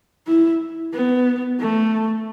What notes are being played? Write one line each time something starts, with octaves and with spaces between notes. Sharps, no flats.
E4
B3
A3